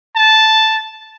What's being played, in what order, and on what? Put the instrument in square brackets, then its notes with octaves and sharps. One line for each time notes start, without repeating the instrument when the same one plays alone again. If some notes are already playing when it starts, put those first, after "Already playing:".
[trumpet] A5